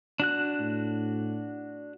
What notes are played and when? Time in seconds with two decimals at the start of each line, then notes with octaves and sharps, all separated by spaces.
0.20 D4 F#4 F#6
0.60 A2